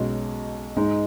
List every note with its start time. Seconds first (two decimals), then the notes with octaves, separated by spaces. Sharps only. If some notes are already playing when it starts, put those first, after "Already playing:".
Already playing: B1 B2 G#3 C#4
0.77 G#2 G#3 D#4